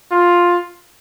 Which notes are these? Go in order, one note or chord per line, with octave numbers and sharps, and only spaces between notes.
F4